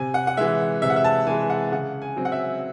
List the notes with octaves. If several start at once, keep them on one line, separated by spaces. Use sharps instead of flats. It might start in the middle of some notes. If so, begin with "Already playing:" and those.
Already playing: C3 G#5
F#5
F#5
E3 G#3 E5
C3 E5
F#5
E5
A5
E3 G#3 G#5
F#5
C#3 F#5
G#5
F#3 C4
F#5
E5